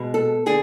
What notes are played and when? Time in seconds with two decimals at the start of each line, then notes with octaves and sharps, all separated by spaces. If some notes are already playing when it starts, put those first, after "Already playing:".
Already playing: B2 G#3
0.14 A4
0.46 D3 G#4